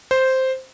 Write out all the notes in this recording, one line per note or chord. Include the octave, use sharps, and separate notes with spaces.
C5